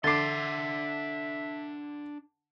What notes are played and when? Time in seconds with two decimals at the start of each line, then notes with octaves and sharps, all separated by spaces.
0.04 D3 D4 E5 C6 D6 A6 C7